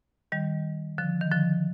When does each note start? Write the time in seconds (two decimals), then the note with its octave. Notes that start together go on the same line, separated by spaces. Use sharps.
0.32 D#3 G3
0.98 D3 F3
1.21 D#3
1.32 D3 F3